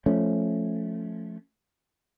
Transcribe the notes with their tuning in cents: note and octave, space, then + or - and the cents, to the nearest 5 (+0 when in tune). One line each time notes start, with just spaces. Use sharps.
F3 +0 A3 -5 C#4 +0